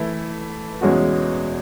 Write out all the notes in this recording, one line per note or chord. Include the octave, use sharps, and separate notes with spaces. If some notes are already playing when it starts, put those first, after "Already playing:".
Already playing: E3 A3 E4
E2 B2 G#3 C#4 F#4